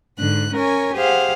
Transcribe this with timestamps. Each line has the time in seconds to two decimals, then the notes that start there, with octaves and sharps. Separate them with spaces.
0.19 G#2 D3 F#6
0.54 C#4 A#4 C#5 G#5
0.95 G4 G#4 C5 F5 F#5